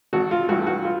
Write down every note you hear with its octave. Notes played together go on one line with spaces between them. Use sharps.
G#1 F#4
F4
G2 E3 A3 F#4
F#4
F4